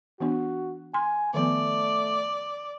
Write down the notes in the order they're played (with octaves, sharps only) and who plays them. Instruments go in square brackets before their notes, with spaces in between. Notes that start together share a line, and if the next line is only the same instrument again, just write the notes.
[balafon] E3 B3 D4 [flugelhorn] F#4
[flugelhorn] G#5 [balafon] C6
[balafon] D#3 F3 B3 [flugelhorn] A3 [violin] D5